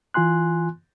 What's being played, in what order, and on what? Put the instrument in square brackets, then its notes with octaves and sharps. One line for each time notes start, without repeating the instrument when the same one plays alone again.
[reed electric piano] E3 F4 G#5 C6 F#6